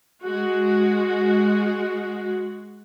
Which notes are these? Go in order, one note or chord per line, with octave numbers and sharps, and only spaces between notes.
G#3 F#4